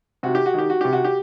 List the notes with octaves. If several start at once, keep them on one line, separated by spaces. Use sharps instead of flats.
C3 F#4
G4
F#4
D#3 G4
F#4
C3 G4
F#4
G4